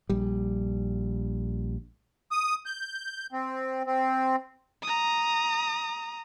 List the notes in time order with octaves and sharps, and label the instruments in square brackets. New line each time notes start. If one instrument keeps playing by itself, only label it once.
[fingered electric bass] A#1 G3
[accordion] D#6
G6
C4
C4
[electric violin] A#5 D#6